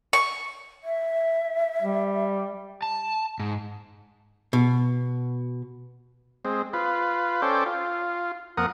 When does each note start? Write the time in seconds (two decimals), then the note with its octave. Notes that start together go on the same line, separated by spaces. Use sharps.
0.13 C#6
0.84 E5
1.82 G3
2.82 A5
3.40 G#2
4.53 B2
6.45 G#3 C4
6.73 F4 B4
7.42 C#4 A4 C5 D5 G5
7.66 F4
8.57 F2 A#3 A#4 F#5 D#6